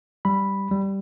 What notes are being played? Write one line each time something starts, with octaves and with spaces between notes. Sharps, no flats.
G3 B5
G3